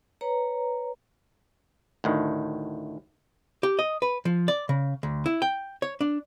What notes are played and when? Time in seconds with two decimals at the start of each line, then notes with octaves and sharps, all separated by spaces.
0.21 B4 C#5 A#5
2.04 D2 A2 D#3
3.63 G4
3.79 D#5
4.02 B4
4.25 F3
4.48 D5
4.69 C#3
5.03 D2
5.26 E4
5.42 G5
5.82 C#5
6.01 D4